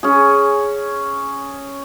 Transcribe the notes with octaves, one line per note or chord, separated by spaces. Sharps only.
C#4 G#4